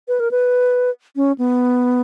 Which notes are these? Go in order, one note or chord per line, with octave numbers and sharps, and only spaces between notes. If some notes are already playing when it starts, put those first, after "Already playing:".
B4
A#4
B4
C#4
B3